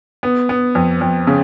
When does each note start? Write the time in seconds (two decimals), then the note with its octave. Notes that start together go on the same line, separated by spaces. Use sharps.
0.23 B3
0.49 B3
0.75 F2
1.01 F2
1.27 C#3